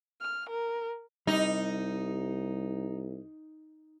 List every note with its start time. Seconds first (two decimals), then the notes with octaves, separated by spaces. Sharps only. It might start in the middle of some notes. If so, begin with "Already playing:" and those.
0.21 F6
0.50 A#4
1.27 C2 G3 D#4